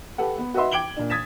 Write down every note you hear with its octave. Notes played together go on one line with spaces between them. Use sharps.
G4 A4 B4 F#5
B3
F#4 B4 D#5 E5 C6
G5 D6 G#6 D7 F#7 G7
A#2 D4
D#6 G#6 A6 B6 E7